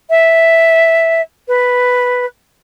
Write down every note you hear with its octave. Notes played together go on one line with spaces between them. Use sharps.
E5
B4